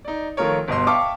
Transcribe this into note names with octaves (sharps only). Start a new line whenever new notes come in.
D#4 D5
D#3 F3 A3 F4 A#4 C#5
G1 B2 D#5 C6
E5 F5 G5 A5 C#6 D6